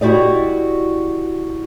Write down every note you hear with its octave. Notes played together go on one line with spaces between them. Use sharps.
E4 F#4 G4 D5 D#5